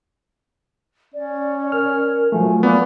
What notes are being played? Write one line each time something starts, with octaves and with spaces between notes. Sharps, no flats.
C#4 D5
A#4 F6
F3 F#3 A3 G#5
A#3 B3 D5